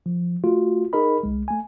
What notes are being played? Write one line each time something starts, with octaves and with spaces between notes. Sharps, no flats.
F3
A3 F4 F#4
D#4 G#4 A#4 D#5 B5
C2 G#3
A3 G#5